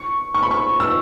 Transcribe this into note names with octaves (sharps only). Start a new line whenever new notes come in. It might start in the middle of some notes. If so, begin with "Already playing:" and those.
Already playing: C#6
C#6
B5
C#6
E6